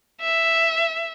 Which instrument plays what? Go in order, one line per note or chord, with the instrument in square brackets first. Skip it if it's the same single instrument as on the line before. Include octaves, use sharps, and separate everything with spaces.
[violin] E5